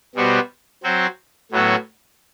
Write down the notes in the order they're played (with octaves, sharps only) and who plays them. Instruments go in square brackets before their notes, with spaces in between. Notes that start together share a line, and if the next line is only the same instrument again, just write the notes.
[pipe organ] B2 G3 B3 F#4 C5
F#3 C4 F#4 C5
A2 F#3 B3 F#4 A4